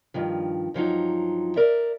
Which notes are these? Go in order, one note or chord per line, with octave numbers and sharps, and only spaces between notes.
G2 D#3 F3
G2 F3 F#3 D#4
A#4 D5 E5